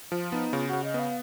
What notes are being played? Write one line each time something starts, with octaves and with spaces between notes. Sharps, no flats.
F3 F4
B3 D#4
C#3 F4
F#4
C#3
D#5
B3
F5